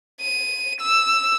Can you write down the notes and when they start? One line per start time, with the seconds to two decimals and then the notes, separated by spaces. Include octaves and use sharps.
0.21 D#7
0.81 E6